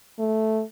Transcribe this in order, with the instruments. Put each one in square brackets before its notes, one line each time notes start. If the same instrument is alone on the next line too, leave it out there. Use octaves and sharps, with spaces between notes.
[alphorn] A3